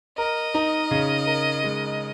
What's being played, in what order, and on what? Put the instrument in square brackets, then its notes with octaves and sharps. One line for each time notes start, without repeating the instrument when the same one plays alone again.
[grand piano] A#4 [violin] D#5
[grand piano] D#4
C#3
A#4
G#3